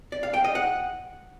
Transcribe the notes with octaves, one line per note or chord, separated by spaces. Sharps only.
D5
F5
G5
D#5
F#5